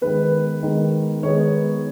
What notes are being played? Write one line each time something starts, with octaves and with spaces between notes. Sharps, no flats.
D#3 G#3 B3 B4
D#3 G#3 B3
D#3 G#3 B3 C#5